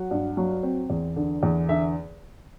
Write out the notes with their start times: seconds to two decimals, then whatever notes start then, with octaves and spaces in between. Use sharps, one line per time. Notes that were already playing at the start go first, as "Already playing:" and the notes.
Already playing: F#3 F#5
0.10 G2
0.37 F#3
0.63 C4
0.90 E2
1.16 D3
1.43 E2
1.69 D3 E5